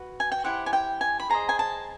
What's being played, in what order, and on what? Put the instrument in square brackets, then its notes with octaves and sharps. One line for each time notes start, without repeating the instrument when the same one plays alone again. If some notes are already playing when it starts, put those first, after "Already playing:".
Already playing: [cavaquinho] F#4 B4
G#5
G5
E4 G4 C5 F#5
G#5
G5
G#5
B5
G#4 C5 D#5 A#5
G#5
A5